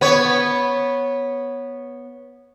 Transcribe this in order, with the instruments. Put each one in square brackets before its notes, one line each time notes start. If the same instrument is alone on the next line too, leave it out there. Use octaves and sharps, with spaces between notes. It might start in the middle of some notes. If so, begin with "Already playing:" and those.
[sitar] B3 C#5